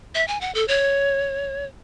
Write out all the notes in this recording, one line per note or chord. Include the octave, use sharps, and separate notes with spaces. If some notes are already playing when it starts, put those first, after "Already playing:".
E5
G#5
F#5
A4
C#5